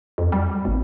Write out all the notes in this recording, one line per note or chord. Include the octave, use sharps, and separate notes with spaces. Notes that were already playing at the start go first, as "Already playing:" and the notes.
F2
G3
G#1